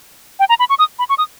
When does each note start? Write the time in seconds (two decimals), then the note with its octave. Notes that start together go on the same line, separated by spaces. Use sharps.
0.40 G5
0.49 A#5
0.59 B5
0.69 C#6
0.79 D#6
0.99 B5
1.09 C#6
1.18 D#6